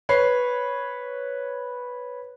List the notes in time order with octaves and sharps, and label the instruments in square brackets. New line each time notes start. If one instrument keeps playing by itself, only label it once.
[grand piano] B4 C#5 C7